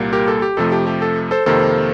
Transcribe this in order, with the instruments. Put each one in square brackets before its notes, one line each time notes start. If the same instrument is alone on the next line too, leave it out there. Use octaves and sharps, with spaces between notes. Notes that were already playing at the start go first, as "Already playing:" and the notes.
Already playing: [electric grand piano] C2 A#2 G3 A#3
G4 A#4
A4
G4
F2 C3 F3 A3 A4
G4
G4
A4
A4 C5
F2 C3 D#3 A#3 A4 C5